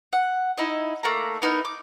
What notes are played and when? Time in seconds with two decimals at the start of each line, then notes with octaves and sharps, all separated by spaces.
0.13 F#5
0.58 D#4 E4 D#5
1.03 A3 A#3 A#5
1.42 B3 D#4 E4 A#4
1.65 D6